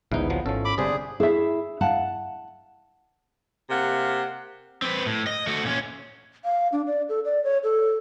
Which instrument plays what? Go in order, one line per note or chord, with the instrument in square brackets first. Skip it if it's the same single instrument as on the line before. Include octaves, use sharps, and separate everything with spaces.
[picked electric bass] A1 D2 [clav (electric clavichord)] G#2 D#4 [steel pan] E3 B3 E4
[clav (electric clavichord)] C3 F3 F#3
[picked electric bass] G#1 [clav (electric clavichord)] F3 A4 [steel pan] C#4
[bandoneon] B5 D6
[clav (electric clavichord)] G1 D4 D5 [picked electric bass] C3 [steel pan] G3 C5 [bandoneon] G#4
[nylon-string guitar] E4 [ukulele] G#4 E5
[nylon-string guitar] F5 F#5 A5
[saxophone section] C3 A#3 F5 F#5
[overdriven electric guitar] C4 B4
A2
D#5
A3 F#4
A#2 C#4
[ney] F5
D4
D5
A4
D5
C#5
A4